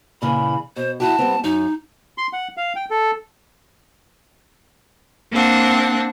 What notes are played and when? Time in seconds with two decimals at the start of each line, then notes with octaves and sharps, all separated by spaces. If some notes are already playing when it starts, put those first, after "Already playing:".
0.22 A#2 C#3 E3 B5
0.76 B2 C5
1.00 E4 F#4 G4 A5
1.19 G3 B3 C4
1.44 F#2 D#4
2.18 C6
2.33 F#5
2.57 F5
2.76 G5
2.90 A4
5.32 A#3 C4 D4 F#5